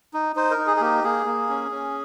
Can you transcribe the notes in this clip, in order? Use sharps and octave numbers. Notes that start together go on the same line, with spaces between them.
D#4
D#4 C5
A#4
D#4
G#4
G#4
A#3 G4
A#3 G#4
A#3
C#4
C#4